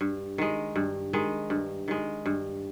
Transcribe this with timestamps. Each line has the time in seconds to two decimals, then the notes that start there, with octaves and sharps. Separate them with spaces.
0.01 G2
0.38 D#3 G#3
0.76 G2
1.13 D#3 G#3
1.50 G2
1.88 D#3 G#3
2.26 G2